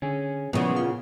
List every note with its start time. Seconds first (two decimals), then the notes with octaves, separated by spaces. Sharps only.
0.02 D3 C#4 G#4
0.53 A#2 C#3 F3 B3 E4 F#4
0.76 F4